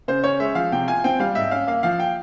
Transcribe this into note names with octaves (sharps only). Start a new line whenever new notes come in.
C#3 C5
C#4 C#5
G#3 E5
F3 F5
C3 G5
F4 G#5
C4 G5
G3 F5
G#2 E5
C#4 F5
A#3 F5
F3 F5
G5